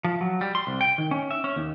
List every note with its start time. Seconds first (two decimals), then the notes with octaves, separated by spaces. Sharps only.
0.04 F3
0.21 F#3
0.41 G3
0.55 C6
0.67 C2
0.81 G5
0.98 D#3
1.11 C#4
1.31 E5
1.44 C#4
1.56 D#2